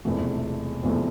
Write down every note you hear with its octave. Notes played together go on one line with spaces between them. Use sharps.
E1 E2 C3 F3 A3
E1 E2 C3 F3 A3